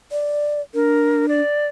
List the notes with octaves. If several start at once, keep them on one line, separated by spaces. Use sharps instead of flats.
D5
D4 A#4
D5